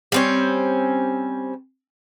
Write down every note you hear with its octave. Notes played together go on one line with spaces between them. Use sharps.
G3 C4 C#4